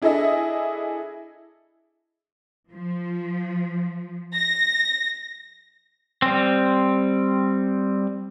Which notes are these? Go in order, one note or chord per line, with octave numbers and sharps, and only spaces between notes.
D4 E4 G#4 A4 D#5 E5
F3
A#6
G3 C4